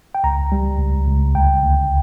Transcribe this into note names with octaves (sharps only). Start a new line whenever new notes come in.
G5
C#2 A#5
G3
C#2
C#2
D2 G5
D2